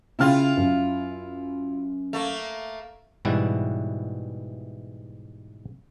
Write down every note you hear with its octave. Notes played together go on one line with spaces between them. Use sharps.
C#3 E4 F4 G5 F6
F#2
A3 A#3
G#2 B2 E3 G3 E4 F#4